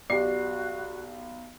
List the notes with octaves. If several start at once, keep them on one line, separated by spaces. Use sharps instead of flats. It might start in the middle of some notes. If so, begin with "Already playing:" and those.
B1 F#4 G4 D5 C7